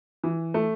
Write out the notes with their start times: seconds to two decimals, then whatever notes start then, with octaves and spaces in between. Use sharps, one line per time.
0.24 E3
0.54 A3